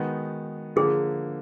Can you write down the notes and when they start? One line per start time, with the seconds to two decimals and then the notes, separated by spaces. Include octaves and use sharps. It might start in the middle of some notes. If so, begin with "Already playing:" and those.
Already playing: D#3 G#3 B3 D#4 F#4
0.76 D3 F3 A#3 G#4